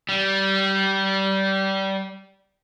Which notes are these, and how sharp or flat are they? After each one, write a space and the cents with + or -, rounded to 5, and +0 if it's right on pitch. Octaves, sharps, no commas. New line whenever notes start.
G3 -20